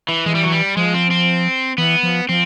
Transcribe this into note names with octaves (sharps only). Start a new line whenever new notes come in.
E3
E3 G#3
G3
F#3
G3
F3 G#3
C4
C4
E3 B3
F3
F3 C4